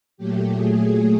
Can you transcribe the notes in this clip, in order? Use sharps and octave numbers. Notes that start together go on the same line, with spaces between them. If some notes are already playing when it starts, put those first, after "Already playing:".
A#2 F#3 A3 G4
G#4